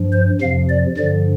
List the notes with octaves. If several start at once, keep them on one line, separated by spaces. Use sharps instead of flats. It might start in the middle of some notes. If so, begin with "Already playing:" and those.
Already playing: G2 F3
C5
F2 C3 F3 F5
D5
G2 D3 F3 D5